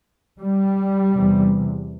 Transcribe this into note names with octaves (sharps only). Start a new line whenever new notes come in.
G3
E2 C3